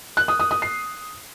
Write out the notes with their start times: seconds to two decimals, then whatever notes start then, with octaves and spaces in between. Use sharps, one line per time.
0.17 F#6
0.28 D#6
0.40 D#6
0.51 D#6
0.62 C7